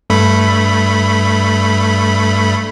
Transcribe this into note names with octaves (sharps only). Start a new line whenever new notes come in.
G2 A3 B5